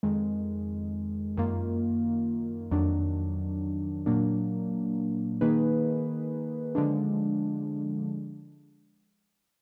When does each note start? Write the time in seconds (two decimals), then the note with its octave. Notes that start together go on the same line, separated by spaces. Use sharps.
0.03 F2 D#3 G#3
1.37 F#2 D#3 A#3 F4
2.71 F2 D#3 F#3 D4
4.06 A#2 F#3 A#3 D4
5.41 D#3 A#3 D#4 G#4 B4
6.75 D3 F3 G#3 D4